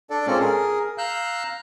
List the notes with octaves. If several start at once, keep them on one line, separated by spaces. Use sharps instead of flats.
D4 A4 D5
A#2 G#3 A#3 C4 C#4 A4
G#4 A#4
F5 A#5 E6 F#6 G6